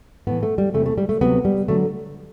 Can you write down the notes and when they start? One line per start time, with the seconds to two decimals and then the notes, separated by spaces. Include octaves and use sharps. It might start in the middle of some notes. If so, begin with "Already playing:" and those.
0.27 A2 E3 B3
0.43 A3
0.58 G3
0.74 E2 C3 E3 A3
0.86 A3
0.98 G3
1.09 A3
1.21 D2 C3 F#3 B3
1.45 G3
1.68 D3 F#3 A3